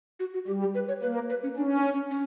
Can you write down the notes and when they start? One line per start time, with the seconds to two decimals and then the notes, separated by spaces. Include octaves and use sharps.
0.20 F#4
0.34 F#4
0.47 G3 G4
0.62 G4
0.75 B4
0.88 C#5
1.02 A#3 B4
1.30 B4
1.43 C#4
1.57 C#4 D4
1.75 D4
1.93 C#4
2.11 C#4